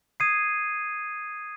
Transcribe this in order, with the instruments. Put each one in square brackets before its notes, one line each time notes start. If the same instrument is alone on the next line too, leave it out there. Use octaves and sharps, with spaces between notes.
[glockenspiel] D#6 G#6 C7 D#7